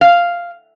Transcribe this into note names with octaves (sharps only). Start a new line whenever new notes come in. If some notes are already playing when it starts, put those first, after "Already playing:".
F5